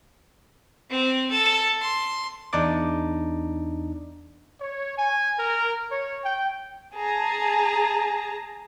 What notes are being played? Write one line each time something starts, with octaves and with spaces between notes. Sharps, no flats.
C4
A4
C6
E2 D4 D#4 D5 D6
C#5
G#5
A#4
C#5
G5
G#4 A5 A#5